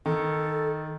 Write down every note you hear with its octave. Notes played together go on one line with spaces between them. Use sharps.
D#3 A4